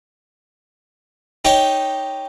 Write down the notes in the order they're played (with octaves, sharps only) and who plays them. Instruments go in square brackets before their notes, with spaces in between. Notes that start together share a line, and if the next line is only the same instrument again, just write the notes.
[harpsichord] D#4 G4 C#5 G5